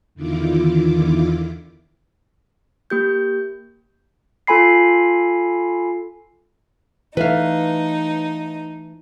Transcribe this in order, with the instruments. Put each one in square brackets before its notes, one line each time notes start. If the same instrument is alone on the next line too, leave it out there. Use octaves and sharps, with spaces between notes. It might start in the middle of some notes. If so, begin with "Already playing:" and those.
[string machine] E2 D3 D#3 E4 F4 D6
[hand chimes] A#3 G4 G6
[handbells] F4 A4 G#5 B5 C7
[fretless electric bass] E3 A3 [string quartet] D#4 [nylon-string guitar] B4 E5 F5